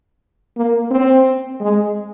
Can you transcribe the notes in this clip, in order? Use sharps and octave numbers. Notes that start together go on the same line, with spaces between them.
A#3
C4
G#3